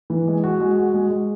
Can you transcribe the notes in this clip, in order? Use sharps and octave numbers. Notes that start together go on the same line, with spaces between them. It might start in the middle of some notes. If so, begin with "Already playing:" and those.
E3
G#3
F#4
G#3
F#4
G#3
G#3